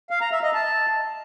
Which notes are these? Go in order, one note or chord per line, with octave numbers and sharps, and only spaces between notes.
F5
A#5
E5
D#5
A5